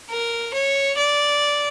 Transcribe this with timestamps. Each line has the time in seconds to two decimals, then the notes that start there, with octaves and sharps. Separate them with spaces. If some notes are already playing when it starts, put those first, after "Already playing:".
0.10 A#4
0.54 C#5
0.98 D5